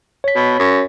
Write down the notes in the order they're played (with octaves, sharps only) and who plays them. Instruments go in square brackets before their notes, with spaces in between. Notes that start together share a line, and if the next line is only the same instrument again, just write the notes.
[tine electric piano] C#5 B6
[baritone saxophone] B2
F#2